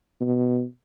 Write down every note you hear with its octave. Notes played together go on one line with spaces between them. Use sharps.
B2